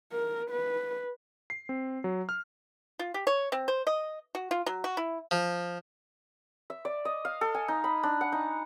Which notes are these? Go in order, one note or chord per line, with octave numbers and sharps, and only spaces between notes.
A#4
B4
C7
C4
F#3
F6
F4
G4
C#5
C4
C5
D#5
F#4
F4
F#3
F#4
E4
F3
E5
D5
D#5
F5
A4
G#5
D#4
B5
D4
F#5
D#4